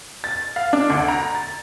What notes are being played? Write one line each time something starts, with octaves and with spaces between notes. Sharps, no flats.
A6
F5
D4
D2
A#5
A6